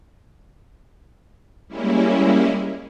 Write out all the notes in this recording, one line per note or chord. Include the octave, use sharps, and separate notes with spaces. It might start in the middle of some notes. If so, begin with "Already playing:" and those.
G3 G#3 A#3 C#4 E4